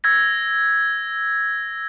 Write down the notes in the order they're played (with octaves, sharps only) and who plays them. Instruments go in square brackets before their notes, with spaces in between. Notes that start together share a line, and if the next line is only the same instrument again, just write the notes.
[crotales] E6 G#6 A#6